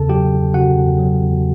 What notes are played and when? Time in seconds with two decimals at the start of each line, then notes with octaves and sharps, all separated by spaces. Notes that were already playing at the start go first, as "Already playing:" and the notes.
Already playing: E2 C#3 A4 A5
0.09 F#3 G4 G5
0.32 E2
0.54 C#3 F#4 F#5
0.76 E2
0.99 F#3
1.21 E2